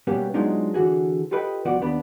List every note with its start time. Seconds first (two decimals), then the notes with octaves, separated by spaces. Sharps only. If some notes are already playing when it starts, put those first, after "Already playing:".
0.07 B2 G3 A#3 B3 C#4 G4
0.34 F#3 G#3 B3 D4 D#4 F4
0.74 D3 E3 F#4 G#4
1.31 F4 G4 A4 B4 D#5 G5
1.65 C2 F3 B3 F#4 D5 F#5
1.81 D#2 B3 D4 B5